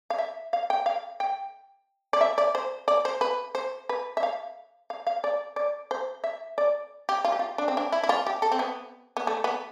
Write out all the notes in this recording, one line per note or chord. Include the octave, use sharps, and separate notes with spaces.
F5
E5
F5
G5
F5
G5
D5
E5
D5
C5
D5
C5
B4
C5
B4
E5
F5
F5
F5
D5
D5
C5
E5
D5
G4
F4
G4
F4
D4
C4
D4
E4
E4
F4
G4
A4
C4
B3
B3
A3
B3